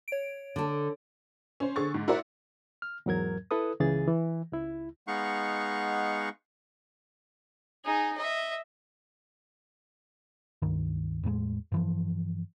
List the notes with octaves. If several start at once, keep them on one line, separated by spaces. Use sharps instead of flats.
C#5 D7
D3 A4
C#4 C5
D3 G#4 C#6 A6
G#2
E4 F#4 A#4 C5 D5 E5
F6
E2 G#2 F#3 A#4 G#6
E4 A4 B4 D#6
C#2 C#3 E3 G#4 A6
E3
C#2 E4
G#3 B3 D#4 F5 F#5 C#6
D#4 G#4
D#5 E5
C#2 G2 D#3
E2 A2 G3 G#3
G2 E3 F3